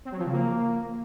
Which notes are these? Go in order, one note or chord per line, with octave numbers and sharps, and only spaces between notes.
C4
F#3
F3
C#3
A#3